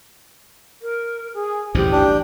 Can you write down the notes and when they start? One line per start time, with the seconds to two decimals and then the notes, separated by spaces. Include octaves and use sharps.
0.82 A#4
1.34 G#4
1.75 A1 D2 G2 G4 C5
1.92 D4 G5